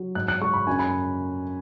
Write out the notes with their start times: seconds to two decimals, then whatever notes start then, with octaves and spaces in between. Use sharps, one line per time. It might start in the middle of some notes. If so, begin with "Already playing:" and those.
Already playing: F#3
0.15 G#2 F#6
0.28 F#6
0.41 G#3 C#6
0.54 B5
0.67 F#2 G#5
0.79 B5